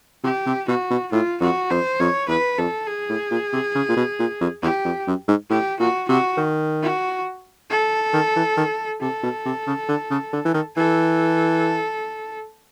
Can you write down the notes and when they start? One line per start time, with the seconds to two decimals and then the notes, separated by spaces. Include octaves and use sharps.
0.24 C3 G4
0.46 C3
0.68 B2 F#4
0.90 B2
1.12 A2 F4
1.41 F2 F#4
1.70 F2 C5
2.00 F2 C#5
2.28 E2 B4
2.58 F2 A4
2.87 G#4
3.09 A2
3.31 A#2
3.53 C3
3.75 C#3
3.89 A#2
3.97 B2
4.19 A#2
4.41 F2
4.62 E2 G4
4.85 F2
5.07 F#2
5.28 G#2
5.50 A2 G4
5.80 A#2 F#4
6.09 C3 F#4
6.37 D#3
6.82 F#4
7.70 A4
8.13 D#3
8.36 E3
8.57 D#3
9.01 C3 A4
9.23 B2
9.45 C3
9.67 C#3
9.88 D3
10.10 C#3
10.33 D3
10.45 E3
10.54 D#3
10.76 E3 A4